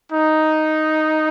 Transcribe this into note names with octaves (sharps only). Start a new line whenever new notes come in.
D#4